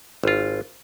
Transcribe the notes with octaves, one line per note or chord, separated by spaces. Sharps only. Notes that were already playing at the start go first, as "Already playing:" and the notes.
G#1 F4